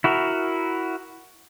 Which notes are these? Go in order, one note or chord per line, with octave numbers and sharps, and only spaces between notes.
E4 F#4 A#4